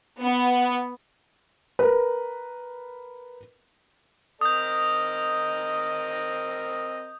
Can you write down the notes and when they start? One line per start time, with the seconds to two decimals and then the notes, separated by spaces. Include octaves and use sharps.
0.22 B3
1.79 A#4 B4
4.41 C4 A#4 D#5 D#6 G6